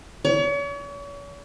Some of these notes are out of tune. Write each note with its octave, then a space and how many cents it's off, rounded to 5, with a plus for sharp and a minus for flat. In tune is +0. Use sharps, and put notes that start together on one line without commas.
C#5 +40